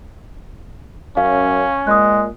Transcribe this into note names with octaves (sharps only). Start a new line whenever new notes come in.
F#2 C#4 F5
A#2 G#3 D#6 F#6